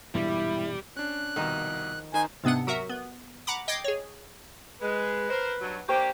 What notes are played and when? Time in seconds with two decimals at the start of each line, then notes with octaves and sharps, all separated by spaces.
0.15 E1 G2 A#2 G3 E4
0.96 C#4 D4 F#6
1.36 C2 B2 D#3 F3 D#4
2.14 D#3 D#4 C5 G#5
2.44 G#2 C3 B3 D4 F#5
2.67 F#3 F#4 A#4 E5
2.89 B3
3.47 F#5 A#5 B5 D6
3.68 D#5 G5 D6 G#6 C7
3.84 G#4 C#5
4.82 G#3 B4
5.30 A#4 C5
5.61 G2 B2 F#3
5.89 A#3 D4 G4 C5 G5 C#6